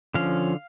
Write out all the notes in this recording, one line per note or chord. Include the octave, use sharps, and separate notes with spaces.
D3 F3 C#4 F5